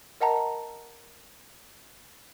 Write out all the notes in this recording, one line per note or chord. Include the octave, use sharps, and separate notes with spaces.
A#4 D#5 F#5 A5 A#5